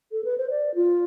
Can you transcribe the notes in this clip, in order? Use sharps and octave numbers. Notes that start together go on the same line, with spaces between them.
A4
B4
C5
D5
F4